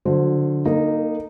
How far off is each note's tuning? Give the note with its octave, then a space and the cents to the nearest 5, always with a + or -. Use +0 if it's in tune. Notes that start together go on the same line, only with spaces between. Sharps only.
D3 +0 F#3 -35 C5 +0
A#3 +0 D#4 -10 A4 +35